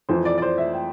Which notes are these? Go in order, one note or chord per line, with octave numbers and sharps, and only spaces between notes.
F2 E3 C5
D5
D5
C5
E5
G5